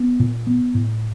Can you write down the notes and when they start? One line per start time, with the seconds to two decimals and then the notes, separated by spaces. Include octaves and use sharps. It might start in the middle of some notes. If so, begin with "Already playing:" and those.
Already playing: B3
0.20 A#2
0.47 B3
0.75 A2